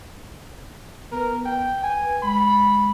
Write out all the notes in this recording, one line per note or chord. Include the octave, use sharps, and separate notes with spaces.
B3 A#4 B4
B4 G5
G#5
G#3 B5